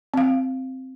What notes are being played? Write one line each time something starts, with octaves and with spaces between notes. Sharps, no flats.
C4 F5